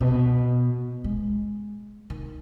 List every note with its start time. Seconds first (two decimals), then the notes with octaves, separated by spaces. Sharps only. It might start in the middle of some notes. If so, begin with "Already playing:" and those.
0.01 B2
1.04 G#3
2.10 D#3